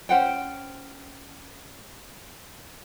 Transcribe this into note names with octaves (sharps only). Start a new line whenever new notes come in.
C#4 C5 F#5 G5